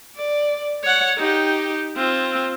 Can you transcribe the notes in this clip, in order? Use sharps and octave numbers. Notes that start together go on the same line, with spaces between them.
D5
C#5 F#5
D#4 G4
C4 F4